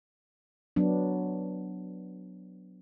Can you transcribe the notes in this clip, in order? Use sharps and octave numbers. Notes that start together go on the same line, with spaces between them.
F#3 B3 D4